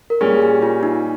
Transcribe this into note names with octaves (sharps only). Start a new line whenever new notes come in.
A#4
A#2 G3 C#4 G#4
G4
F4
D#4